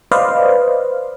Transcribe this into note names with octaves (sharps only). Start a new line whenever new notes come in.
B4 C5 D5 D#5 F5